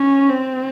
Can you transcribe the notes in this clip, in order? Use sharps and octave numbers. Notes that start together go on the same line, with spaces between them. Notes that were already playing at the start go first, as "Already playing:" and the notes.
Already playing: C#4
C4